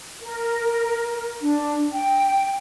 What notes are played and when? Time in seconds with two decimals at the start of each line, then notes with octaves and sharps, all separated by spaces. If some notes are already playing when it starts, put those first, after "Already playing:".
0.21 A#4
1.40 D4
1.93 G5